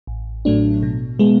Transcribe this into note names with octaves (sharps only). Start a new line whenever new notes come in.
A1
A2 F#3 A3 D4
B2
G#3 B3